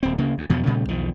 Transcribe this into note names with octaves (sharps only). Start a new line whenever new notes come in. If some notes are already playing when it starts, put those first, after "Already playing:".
D#1 C4
D2 C#3 A#3
D2
E2 G2 B2 F3
A#2 C#3 G3 A3
B1 E2 D#3 F3